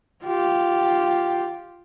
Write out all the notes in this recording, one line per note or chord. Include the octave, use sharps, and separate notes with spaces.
F4 G4